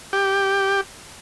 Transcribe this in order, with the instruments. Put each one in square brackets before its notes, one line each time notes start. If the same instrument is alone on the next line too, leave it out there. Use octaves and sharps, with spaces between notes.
[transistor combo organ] G4